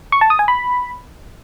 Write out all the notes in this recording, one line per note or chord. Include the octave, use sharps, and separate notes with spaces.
C#6
A5
D#6
G#5
B5